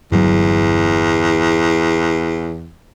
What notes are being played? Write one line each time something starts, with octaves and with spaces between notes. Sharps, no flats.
G1 E2 F#3